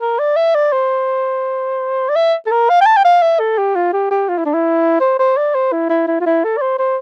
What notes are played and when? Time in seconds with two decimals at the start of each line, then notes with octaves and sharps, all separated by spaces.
0.01 A#4
0.19 D5
0.36 E5
0.55 D5
0.72 C5
2.09 D5
2.16 E5
2.46 A4
2.51 A#4
2.69 F5
2.81 G5
2.86 A5
2.97 G5
3.05 F5
3.22 E5
3.39 A4
3.58 G4
3.76 F4
3.93 G4
4.11 G4
4.29 F4
4.38 E4
4.46 D4
4.54 E4
5.00 C5
5.19 C5
5.37 D5
5.54 C5
5.72 E4
5.89 E4
6.07 E4
6.21 F4
6.26 E4
6.44 A4
6.57 D5
6.61 C5
6.79 C5